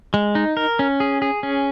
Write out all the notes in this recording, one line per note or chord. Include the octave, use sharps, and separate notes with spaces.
G#3
D#4
A#4
C#4
G#4
G#4
C#4